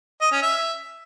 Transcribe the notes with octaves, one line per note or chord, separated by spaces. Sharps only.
D#5
C#4
E5